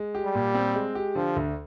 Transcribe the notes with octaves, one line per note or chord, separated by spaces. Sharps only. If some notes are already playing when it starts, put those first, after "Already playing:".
Already playing: G#3
G4
G3
A#2
C4
G#3
G4
D3 F3
D2